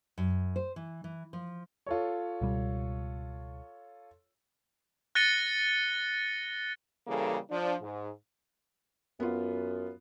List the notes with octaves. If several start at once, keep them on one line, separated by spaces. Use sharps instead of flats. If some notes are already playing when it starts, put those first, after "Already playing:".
F#2
C5
E3
E3
F3
F4 A4 C#5
C#2 B2 G3
F#6 A6 A#6 C#7 D#7 G7
C#3 E3 G3 A#3 A4 A#4
F3 D4
G#2
F#2 B3 F4